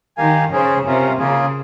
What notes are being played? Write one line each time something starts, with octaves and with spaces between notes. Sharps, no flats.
D#3 G4 A#4 F5 G#5
C#3 C#4 G#4 C5
C3 C#4 F4 A#4 F5
C#3 A#3 F4 G#4